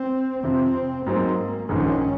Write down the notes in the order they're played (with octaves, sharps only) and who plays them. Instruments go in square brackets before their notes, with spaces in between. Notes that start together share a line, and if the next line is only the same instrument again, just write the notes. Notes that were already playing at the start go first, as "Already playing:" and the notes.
Already playing: [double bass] C4
[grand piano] F2 C3 F3 [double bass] C4
[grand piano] G#2 F#3 C4 [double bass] A#3
[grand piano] A#1 G#2 D#3 [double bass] C#4